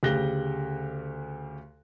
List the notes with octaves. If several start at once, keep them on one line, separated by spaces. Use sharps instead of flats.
D2 C#3 G4 F#6 A#6 G7